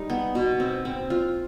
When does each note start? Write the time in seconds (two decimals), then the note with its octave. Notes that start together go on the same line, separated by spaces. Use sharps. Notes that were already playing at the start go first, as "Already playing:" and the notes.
Already playing: G3 D#4
0.10 B3
0.35 B2
0.60 C4
0.85 C4
1.10 F4